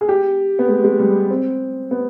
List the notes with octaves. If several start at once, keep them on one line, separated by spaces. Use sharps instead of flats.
G#4
G4
B3
G#3
G#3
G3
C4
B3